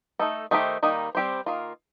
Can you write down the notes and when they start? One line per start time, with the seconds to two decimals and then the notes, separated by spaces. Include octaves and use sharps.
0.19 A3 D#4 A4
0.51 D#3 A3 D#4 G4 C5
0.83 D#3 G3 A#3 D#4
1.15 G3 C4 G4 C5
1.46 D#3 A#3 F4